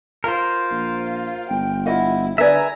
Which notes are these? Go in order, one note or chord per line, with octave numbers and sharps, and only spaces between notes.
F4 A#4 C5
A#1
G1 G5
E4 F4 D#5 F#5
D3 G#4 B4 D5 E5 G#5 A#5